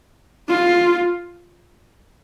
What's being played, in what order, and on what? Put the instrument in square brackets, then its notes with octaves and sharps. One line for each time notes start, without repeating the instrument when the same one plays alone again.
[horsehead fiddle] F4